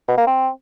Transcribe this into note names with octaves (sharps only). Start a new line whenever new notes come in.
B2
A#3
C4